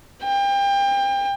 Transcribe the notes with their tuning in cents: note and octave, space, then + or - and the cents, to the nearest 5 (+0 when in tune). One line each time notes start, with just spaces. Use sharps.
G5 +30